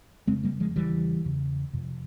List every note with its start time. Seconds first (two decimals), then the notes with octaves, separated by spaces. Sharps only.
0.27 F2 C#3 G#3 C4
0.44 G3 A#3
0.60 F3 G#3
0.76 E2 C#3 E3 G3
1.25 E2 C#3
1.73 F2 C3